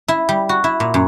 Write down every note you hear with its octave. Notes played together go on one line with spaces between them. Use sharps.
E4
G3
F#4
E4
A#2
F#2